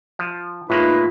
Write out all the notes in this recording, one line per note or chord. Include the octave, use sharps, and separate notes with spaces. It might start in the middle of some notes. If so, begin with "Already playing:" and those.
F3
A2 G#3 A#3 D#4 F4 B4